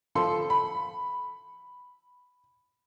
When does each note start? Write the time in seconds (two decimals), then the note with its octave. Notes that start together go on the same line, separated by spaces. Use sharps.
0.15 F3 A4 C6
0.50 B5